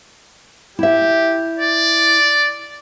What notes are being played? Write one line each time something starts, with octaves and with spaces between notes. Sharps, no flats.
E4 G4 E5
D5